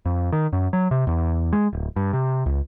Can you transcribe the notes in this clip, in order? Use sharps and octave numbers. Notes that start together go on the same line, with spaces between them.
F2
D#3
F#2
F#3
C3
E2
G#3
D1
G2
C3
C#2